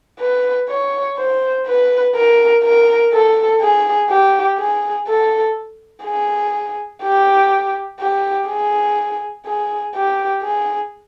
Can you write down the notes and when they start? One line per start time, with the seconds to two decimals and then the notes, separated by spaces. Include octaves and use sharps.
0.19 B4
0.69 C#5
1.17 C5
1.66 B4
2.15 A#4
2.63 A#4
3.13 A4
3.61 G#4
4.09 G4
4.58 G#4
5.07 A4
6.05 G#4
7.03 G4
8.00 G4
8.48 G#4
9.45 G#4
9.95 G4
10.43 G#4